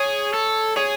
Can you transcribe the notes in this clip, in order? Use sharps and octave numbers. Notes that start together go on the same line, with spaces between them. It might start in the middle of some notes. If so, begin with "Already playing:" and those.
Already playing: G#4 C#5
A4
G#4 C#5